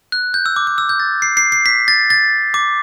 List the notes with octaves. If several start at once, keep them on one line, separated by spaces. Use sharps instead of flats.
F#6
G6
E6
D6
D6
E6
G6
A6
C7
C7
C7
B6
A6
A6
D6